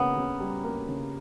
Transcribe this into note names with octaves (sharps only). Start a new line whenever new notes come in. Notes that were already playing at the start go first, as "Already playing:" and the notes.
Already playing: C#3 A#3 B3
C#3
G3
A#3
C#3